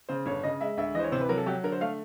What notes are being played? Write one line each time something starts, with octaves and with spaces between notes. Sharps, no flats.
C#3 C5
G1 C#5
C#3 D#5
G#3 E5
D2 E5
E3 C5 D#5
C#5
C3 C5
B4
F#3 A#4
A4
F#3 G4
D3 A#4
C5
A3 F5